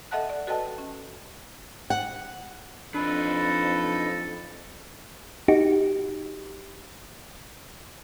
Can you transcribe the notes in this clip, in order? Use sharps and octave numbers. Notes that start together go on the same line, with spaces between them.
A4 D#5 E5 F#5 A5 F#6
D5
F#4 A4 B4 D#5 G5 A5
C#4
F#5
F2 D4 D#4 A4 B4
D#4 F#4 G4